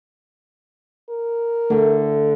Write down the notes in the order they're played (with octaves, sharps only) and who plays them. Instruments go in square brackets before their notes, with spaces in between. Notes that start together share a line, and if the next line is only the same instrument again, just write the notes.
[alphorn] A#4
[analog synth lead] D3 [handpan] A3